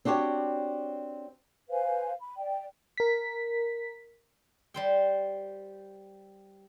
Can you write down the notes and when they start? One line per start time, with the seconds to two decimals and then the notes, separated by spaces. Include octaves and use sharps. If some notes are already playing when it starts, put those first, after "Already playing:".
0.05 C4 D4 F#4 G4 C#5
1.70 B4 C5 F5 G#5
2.20 B5
2.36 D5 G5
2.98 A#4 B6
4.74 G3 C5 G5